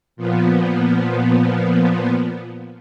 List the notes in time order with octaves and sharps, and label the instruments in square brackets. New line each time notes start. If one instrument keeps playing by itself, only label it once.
[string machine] A#2 F3 B3